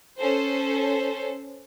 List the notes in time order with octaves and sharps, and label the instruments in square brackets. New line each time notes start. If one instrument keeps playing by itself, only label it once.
[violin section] C#4 A4 C5